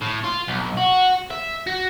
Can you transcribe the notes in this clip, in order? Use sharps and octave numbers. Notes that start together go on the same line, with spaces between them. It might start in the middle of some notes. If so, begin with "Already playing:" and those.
A2
F4
B1
F#4
E5
F#4